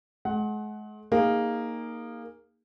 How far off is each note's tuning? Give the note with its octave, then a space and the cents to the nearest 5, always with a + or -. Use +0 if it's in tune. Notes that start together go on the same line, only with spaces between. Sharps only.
G#3 +40 F#5 +5
A#3 +0 D#4 +0 G#4 -25